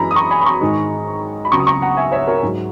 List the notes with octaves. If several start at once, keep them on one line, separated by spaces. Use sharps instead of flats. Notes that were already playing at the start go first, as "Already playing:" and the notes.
Already playing: F#2 E3 G#3 A#5 B5
D#6
A#5 C#6
G#5 B5
B5
A#5 C#6
G#2 D#3 G#3
B5
C#2 C#3 F#3 A#5 C#6
D#6
A#5 C#6
F#5 A#5
E5 G#5
C#5 E5
A#4 C#5
G#2 F#3 G#4